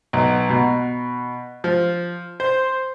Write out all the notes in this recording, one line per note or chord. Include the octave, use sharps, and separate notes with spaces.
B1
B2
F3
C5